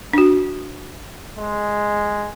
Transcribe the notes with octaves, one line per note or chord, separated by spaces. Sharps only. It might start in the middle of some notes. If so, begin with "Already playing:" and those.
D4 F#4
G#3